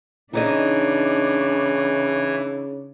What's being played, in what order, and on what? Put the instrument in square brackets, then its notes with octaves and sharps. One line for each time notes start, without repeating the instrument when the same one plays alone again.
[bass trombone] C#3 [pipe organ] E3 [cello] D4 [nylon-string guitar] D#4 D5 D#5